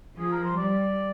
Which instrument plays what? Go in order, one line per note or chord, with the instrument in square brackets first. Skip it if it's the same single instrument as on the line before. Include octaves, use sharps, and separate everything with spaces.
[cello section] F3 [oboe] G#4
[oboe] A#4
C5
[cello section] G3 [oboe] D5